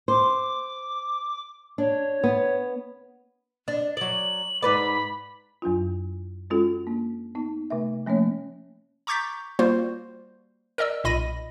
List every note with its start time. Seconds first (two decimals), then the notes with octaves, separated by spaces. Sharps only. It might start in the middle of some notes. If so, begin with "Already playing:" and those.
0.08 C5 D6
1.78 D4 C#5
2.24 B3
3.68 D4
3.97 F#3 D5 F#7
4.62 G#2 B4 D5 B5
5.62 F#2 F#3 D4 F4
6.50 G#3 C#4 F4 F#4 A4
6.87 A#3 D4
7.35 B3 D#4
7.70 C3 A3 E5
8.06 F3 A3 A#3 C#4 C#5
9.07 A#5 C#6 D6 G6 A6 B6
9.59 G3 A#3 F4 F#4 C5
10.78 A#4 D5 D#5 E6
11.04 B1 A#2 D#5 B5 A#6 D#7